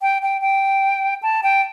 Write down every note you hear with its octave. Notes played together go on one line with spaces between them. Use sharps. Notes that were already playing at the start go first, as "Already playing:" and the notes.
G5
G5
G5
A5
G5